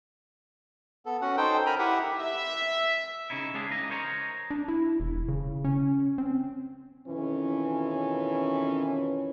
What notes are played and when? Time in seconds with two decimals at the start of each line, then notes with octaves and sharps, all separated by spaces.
1.06 B3 A4
1.22 C#4 F#4 F#5
1.37 D#4 A4 C5 G5
1.66 A#4 G#5 A#5 B5
1.79 E4 G4 E5 F#5
2.19 E5
3.30 C#3 C#4 D#4 E4
3.54 G#3 C#4 D4 G4 G#4 F5
3.71 C#3 E3 D#5 A#5
3.90 A#4 C5 C#5 D#5 A5 A#5
4.50 D4
4.68 E4
5.00 E1
5.28 C#3
5.64 C#4
6.18 C4
7.07 F2 B2 D#3 E3 C#4